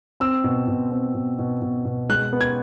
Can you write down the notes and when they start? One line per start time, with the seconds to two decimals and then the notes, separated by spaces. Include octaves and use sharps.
0.20 C4 E6
0.44 B2
0.68 B2
0.91 C4
1.15 B2
1.39 B2
1.62 B2
1.85 B2
2.09 G#3 F#6
2.33 B3
2.41 G#6